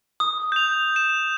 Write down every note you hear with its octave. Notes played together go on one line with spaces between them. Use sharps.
D#6
G6 F7
E7